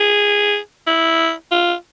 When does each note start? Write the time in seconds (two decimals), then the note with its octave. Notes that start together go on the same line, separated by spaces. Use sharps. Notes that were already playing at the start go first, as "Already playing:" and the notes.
Already playing: G#4
0.87 E4
1.52 F4